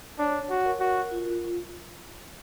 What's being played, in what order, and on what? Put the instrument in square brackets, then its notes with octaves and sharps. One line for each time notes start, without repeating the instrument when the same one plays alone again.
[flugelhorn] D4 [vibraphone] C#5
[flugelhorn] F#4
[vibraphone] A#4
[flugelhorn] F#4
[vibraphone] F4